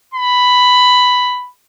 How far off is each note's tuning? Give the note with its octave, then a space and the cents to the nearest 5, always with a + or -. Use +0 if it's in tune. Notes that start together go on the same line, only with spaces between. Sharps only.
B5 +5